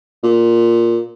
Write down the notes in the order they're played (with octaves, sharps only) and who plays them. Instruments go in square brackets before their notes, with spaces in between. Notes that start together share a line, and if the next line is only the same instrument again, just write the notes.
[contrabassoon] A#2